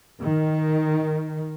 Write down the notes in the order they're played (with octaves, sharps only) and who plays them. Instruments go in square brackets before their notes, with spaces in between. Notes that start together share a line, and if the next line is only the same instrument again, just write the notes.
[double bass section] D#3